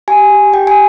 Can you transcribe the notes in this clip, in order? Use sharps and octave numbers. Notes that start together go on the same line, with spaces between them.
G4 G#5
G4
G4 G5
G#5